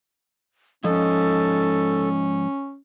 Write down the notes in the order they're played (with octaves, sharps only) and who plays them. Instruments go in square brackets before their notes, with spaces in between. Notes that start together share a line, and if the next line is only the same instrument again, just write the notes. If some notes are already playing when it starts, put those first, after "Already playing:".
[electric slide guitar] G#2 F3 D#5 [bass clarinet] C#4 [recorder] A4